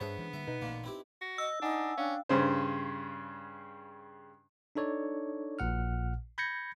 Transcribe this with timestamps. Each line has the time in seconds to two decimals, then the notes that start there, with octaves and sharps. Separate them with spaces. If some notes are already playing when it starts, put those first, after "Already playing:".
0.01 G2 B3 D4 G#4 C5 C#5 E5
0.18 E3 G#3 C#4
0.33 D3 G3 A#3 E5
0.47 B2 D#4 B4 D#5
0.62 A1 A#2 D3 A#3
0.84 C4 E4 G4
1.21 F#4
1.38 D#5 E6
1.62 D4 D#4 F#5 G#5
1.98 C#4 D4 F5 G5
2.29 G2 C#3 C5
4.76 D4 D#4 A4 C#5 D5
5.59 A#1 A#2 F#5 F6
6.38 B5 G6 G#6 A#6 C#7